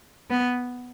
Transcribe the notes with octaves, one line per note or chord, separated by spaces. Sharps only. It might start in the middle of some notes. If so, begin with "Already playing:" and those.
B3